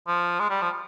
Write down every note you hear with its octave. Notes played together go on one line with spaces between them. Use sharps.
F3
G#3
G3
F3